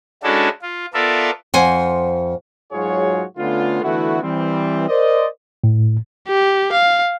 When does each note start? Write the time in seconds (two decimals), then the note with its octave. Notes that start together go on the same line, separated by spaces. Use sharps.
0.23 G#3 C#4 D4 E4 F#4 A4
0.62 F4
0.94 B3 F4 A4 A#4 D5 E5
1.54 F2 C5 F#5 G#5
2.72 G#2 F#3 F4 F#4 G#4 C#5
3.38 D3 A3 B3 C#4 F4
3.82 D3 E3 A3 B3 E4 F#4
4.23 E3 G3 C4
4.89 A#4 C5 D5 D#5
5.64 A2
6.28 G4
6.72 F5